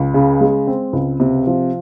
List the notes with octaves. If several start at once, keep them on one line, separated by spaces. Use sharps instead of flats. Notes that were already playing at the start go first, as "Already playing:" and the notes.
Already playing: C#2
C#3
G#3
C4
C#2
C3
F3